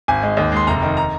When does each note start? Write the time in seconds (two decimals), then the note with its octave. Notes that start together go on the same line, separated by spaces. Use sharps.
0.08 G#1 G#5
0.23 G#3
0.37 D#2
0.52 G#3 C6
0.67 F1 A#5
0.82 D#3
0.97 A#5